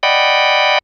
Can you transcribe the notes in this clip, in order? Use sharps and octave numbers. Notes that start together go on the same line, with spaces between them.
D5 D#5 F#5 G5 B5